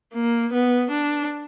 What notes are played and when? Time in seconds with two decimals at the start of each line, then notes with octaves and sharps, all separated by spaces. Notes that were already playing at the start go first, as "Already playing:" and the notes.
0.14 A#3
0.53 B3
0.91 D4